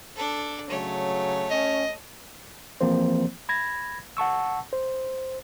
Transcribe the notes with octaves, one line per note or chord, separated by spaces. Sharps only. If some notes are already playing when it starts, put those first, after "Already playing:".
D4 A4
C#3 F#3 A3 C#5
C#4 D#5
E3 F3 A#3 C4 C5
B5 G#6 A#6
F#5 A5 C#6 E6
C5